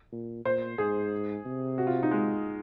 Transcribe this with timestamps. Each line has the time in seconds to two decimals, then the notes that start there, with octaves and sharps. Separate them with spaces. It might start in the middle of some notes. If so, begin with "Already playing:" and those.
0.12 A#2
0.45 A#2 C5
0.78 G#2 G#4
1.46 C3
1.78 F#4
1.87 F4
2.03 D#4
2.11 G#3